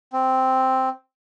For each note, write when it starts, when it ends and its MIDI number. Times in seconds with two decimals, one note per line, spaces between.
0.13 0.89 60